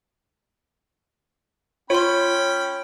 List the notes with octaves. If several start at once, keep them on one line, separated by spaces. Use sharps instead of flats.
C#4 F4 C#5 G5 B5 C6